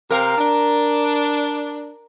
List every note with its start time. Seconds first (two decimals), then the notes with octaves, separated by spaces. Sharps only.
0.11 C3 C4 A#4 F5
0.37 D4